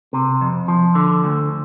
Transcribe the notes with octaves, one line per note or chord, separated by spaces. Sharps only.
C3
F2
F3
D3
D2